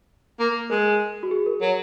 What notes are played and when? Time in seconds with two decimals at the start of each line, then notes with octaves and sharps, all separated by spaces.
0.40 A#3
0.70 G#3 A#4
1.23 F#4
1.31 G#4
1.46 A#4
1.61 F#3 A#4